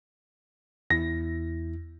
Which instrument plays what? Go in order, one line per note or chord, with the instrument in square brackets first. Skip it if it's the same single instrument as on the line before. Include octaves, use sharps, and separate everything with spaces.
[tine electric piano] E2 E4 [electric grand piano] A#6